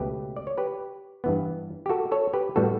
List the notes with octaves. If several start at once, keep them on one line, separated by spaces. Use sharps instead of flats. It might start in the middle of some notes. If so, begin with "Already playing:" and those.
Already playing: C#2 B2 A3 G4 B4
D5
C#5
G4 B4
G2 E3 B3
G4
F#4 A4
A4 C#5
G4 B4
A2 G3 B3 F#4 A4